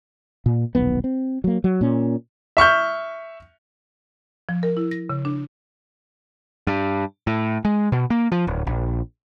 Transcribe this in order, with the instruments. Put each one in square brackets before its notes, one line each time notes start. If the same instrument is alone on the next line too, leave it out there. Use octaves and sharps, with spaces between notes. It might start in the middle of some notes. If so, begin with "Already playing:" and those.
[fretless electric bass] A#2
D#1 B1 B3
C4
F#3 A#3
F#3
A#2 C#4
[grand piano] E5 C#6 F6 G6
[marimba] F3
A#4
E4
A#6
C#3
D4
[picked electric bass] G2
A2
G#3
B2
A#3
F3
D1
A#1